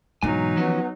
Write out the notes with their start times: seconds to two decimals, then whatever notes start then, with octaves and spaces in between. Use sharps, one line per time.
0.23 G#2 B2 D3 E3 F#3 D#4 G#5
0.57 F3 B3 C#4 F#4